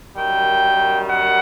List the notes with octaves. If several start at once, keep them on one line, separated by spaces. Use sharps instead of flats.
F#2 D#3 G3 G5
F#5